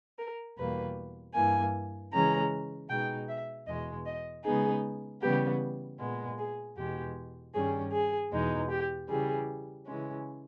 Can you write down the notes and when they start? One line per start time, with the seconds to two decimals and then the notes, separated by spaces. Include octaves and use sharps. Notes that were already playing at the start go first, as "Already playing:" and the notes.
0.18 A#4
0.57 E2 B2 G3 A#3 B4
1.34 G2 E3 A#3 G#5
2.12 C#3 E3 G#3 C#4 A#5
2.89 B2 G#3 D#4 G5
3.28 E5
3.66 E2 B2 G#3 D#5
4.06 D#5
4.44 C#3 G#3 B3 D#4 G#4
5.22 C#3 E3 G3 B3 G4
5.99 A#2 G#3 B3
6.37 G#4
6.76 E2 B2 G#3 G4
7.54 G2 D#3 G3 C#4 G#4
7.92 G#4
8.32 E2 B2 G#3 D#4
8.70 G4
9.08 C#3 E3 G3 G#4
9.86 C#3 E3 G#3 C#4